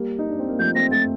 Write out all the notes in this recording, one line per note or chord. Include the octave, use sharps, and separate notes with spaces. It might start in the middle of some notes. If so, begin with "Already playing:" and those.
Already playing: G3 A#3
D#4
D4
C4
A#3
F3 A3 G6
A3 C4 A#6
A3 C4 A6